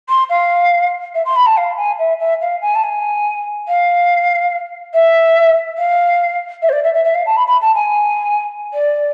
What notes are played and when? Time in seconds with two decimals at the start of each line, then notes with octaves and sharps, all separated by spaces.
0.09 C6
0.30 F5
1.15 E5
1.25 C6
1.36 B5
1.46 A5
1.57 F5
1.77 G#5
1.99 E5
2.19 E5
2.41 F5
2.62 G#5
2.75 A5
2.83 G#5
3.68 F5
4.94 E5
5.78 F5
6.62 E5
6.69 C5
6.72 D5
6.84 E5
6.94 E5
7.05 E5
7.15 F5
7.26 A5
7.37 B5
7.47 B5
7.61 A5
7.75 G#5
8.73 D5